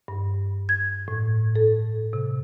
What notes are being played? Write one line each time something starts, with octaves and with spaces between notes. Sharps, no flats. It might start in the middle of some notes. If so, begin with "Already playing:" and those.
G2
G#6
A2
A4
C3